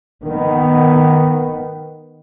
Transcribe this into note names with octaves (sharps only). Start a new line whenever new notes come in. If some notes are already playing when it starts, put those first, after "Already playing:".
D#3 B3